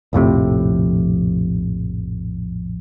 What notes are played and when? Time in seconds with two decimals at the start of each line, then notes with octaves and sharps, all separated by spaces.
0.13 A#1 F2 A2 C3